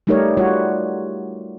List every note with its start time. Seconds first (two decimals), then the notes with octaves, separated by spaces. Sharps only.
0.07 G3 A3 D#4 G4 A#4 C#5
0.37 G3 F4 F#4 C#5